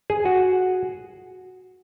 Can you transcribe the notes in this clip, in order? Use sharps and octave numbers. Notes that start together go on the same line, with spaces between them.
G#4
F#4